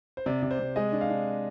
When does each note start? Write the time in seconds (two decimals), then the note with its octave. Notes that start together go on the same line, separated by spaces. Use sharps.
0.17 C5
0.26 C3 D5
0.43 C3
0.51 C5
0.60 C3
0.76 G#3 D#5
0.92 D4
1.01 F5
1.10 D4